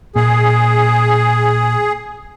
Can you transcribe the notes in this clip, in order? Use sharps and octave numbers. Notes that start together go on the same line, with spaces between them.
A#2 G#4